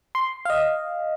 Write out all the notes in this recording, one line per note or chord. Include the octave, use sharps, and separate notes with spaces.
C6
D#5 F5